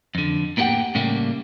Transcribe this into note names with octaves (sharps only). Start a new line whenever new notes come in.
F2 D3
A2 A#3 B3 G4 F#5 G5
A2 C#3 G3 A3 A#3